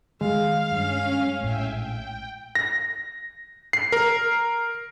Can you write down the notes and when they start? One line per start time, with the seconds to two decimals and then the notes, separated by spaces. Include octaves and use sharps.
0.21 D#3 E3 G3 G#3 F5
0.71 G2 C#4
1.41 A#1 A2 E5 G5 G#5
1.75 G5
2.55 A#6
3.73 C7
3.92 A#4